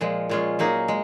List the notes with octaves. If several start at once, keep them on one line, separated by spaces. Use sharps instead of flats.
A#2 F3 G#3
A#2 G#3 C#4 F4
F#3 A#3 D#4 G#4
G#3